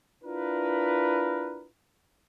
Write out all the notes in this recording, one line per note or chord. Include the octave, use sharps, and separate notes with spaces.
D4 E4 F4 A#4 B4